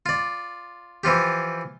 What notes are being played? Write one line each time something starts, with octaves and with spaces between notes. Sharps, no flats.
F4 D5
E3 F3 F4 G4